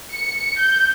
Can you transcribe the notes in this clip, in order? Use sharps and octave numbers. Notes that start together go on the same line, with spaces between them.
C#7
G6